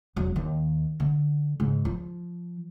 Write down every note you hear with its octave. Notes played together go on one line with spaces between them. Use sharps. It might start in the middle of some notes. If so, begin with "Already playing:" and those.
E1 F#3
D#2 D#3
D3
G#2 C#3
F3